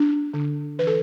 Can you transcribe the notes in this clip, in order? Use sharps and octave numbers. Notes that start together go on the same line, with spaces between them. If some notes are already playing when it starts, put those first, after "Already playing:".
Already playing: D4
D3
E3 B4
A4